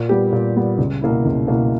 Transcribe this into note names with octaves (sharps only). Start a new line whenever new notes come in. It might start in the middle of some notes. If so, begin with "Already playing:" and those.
Already playing: A#2
G3 B3 G4
A#2
G3 B3 G4
C#2
B2 A#3 E4
C#2
B2 A#3 E4